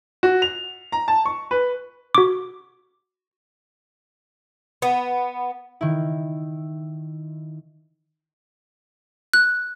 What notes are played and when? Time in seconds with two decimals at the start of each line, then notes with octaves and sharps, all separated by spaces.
0.23 F#4
0.42 F7
0.92 A#5
1.08 A5
1.26 C#6
1.51 B4
2.15 F#4 D6
4.82 B3
5.81 D#3 E4
9.33 F#6